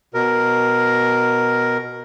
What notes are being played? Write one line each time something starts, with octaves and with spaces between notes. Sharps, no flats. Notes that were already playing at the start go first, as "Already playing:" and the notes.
B2 A#4